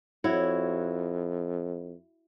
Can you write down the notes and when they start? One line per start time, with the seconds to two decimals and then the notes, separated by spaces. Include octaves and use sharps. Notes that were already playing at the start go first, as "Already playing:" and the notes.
0.24 F2 E4 F#4 C#5